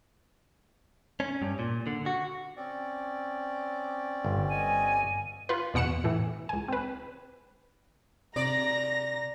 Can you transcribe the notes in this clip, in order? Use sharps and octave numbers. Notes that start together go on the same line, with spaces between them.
C#4
G2
A#2
D3
F#4
C4 C#4 D5
G1
D#5 G#5
F4 B4
E2 B2 F#5 C#7 E7
A2 E3
C#2 G#5
C4 B4
C3 D5 A#5 A#6